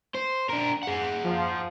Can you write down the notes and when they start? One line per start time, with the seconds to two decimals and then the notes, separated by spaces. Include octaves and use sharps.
0.15 C5
0.50 D4 A#4
0.83 G#4 F#5
1.24 F3